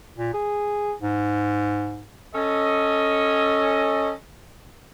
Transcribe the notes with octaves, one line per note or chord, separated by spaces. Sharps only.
A#2
G#4
G#2
C#4 A4 D#5